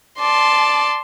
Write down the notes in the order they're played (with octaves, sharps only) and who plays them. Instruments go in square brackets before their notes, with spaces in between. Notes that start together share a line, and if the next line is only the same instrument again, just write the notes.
[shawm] D5 [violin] A5 C6